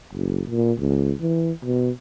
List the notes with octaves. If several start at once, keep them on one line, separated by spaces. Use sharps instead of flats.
F#1
A#2
C#2
E3
B2